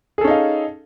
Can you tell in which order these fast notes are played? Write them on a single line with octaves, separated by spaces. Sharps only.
G#4 A4 C#4 D#4 F5